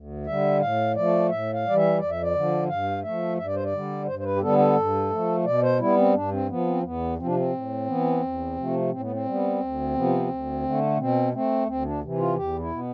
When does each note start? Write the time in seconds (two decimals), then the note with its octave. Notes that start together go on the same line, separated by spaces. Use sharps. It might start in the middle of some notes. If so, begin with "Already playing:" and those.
Already playing: D2
0.27 D3 G3 E5
0.61 A2 F5
0.96 F3 A3 D5
1.30 A2 E5
1.53 F5
1.65 E3 G3 D5
1.77 E5
1.99 F2 D5
2.10 E5
2.22 D5
2.34 D3 F3
2.68 G2 F5
3.03 F3 A3 E5
3.37 G2 E5
3.46 D5
3.55 C5
3.64 D5
3.72 D3 G3
4.07 G2 C5
4.19 C5
4.24 B4
4.36 G4
4.41 D3 G3 B3 A4
4.59 A4
4.76 G2
5.10 F3 A3
5.45 B2 D5
5.62 C5
5.80 G3 B3 E4
5.97 C4
6.14 G2 D4
6.32 C4
6.48 F3 B3
6.66 C4
6.83 E2 B3
7.18 F3 C4
7.22 C3 D4
7.36 C4
7.53 A2
7.87 E3 B3
8.22 E2
8.56 C3 F3 A3
8.90 A2 C4
9.01 B3
9.12 C4
9.25 G3 B3
9.60 D2
9.94 C3 F3 B3
10.29 D2
10.63 D3 A3
10.98 B2 C4
11.33 A3 C4
11.67 D2 C4
11.84 D4
12.02 C3 E3
12.19 F4
12.36 E2 G4
12.59 E4
12.71 B2 B3